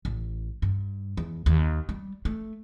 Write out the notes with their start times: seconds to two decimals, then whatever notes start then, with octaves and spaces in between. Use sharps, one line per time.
0.05 A1
0.62 G2
1.17 E2
1.46 D#2
1.89 G3
2.25 A3